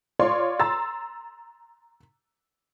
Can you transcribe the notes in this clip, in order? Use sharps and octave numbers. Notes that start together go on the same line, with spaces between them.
F4 C#5 D5 C6
A#5 C6 E6 A6